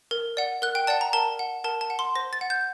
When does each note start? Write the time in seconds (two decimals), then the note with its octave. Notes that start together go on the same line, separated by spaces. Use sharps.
0.11 A#4
0.37 D5 F#5
0.62 A#4 F#6
0.75 G5
0.87 D5 F#5 A5
1.01 A#5
1.13 A#4 A5
1.39 F#5
1.64 A#4 A5
1.81 A5
1.90 F#5
1.99 C6
2.15 C5 A#6
2.33 A6
2.41 F#5
2.50 G6